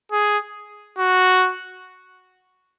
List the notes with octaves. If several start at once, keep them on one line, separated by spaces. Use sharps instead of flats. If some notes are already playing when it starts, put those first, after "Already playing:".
G#4
F#4